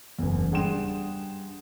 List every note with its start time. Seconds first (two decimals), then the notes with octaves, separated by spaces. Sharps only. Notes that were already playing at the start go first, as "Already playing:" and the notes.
0.19 F#1 E2
0.51 G2 G#4 F#5 G5 C6 E7